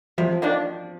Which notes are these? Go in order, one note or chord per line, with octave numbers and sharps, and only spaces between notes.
C3 F3
D#3 A#3 D4